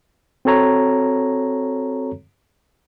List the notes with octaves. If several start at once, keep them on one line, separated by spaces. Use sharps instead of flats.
C4 F#4 A4 C#5 A#5